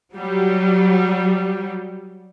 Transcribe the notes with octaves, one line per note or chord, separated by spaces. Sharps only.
F#3 G3